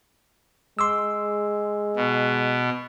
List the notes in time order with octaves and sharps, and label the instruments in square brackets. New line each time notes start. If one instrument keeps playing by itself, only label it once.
[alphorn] G#3 [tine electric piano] C6 D6 E6
[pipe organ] B2